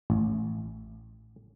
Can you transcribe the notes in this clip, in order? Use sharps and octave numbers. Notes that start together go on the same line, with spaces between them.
A1